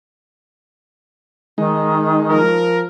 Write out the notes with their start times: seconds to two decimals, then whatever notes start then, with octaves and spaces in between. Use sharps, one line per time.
1.58 D#3 G#3 D#4
2.30 F3 A#4